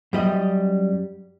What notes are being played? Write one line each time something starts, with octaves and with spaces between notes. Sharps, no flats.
F#2 G3 D#5